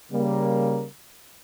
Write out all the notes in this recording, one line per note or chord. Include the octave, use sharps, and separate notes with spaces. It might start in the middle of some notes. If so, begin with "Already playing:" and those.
C#3 G3 A#3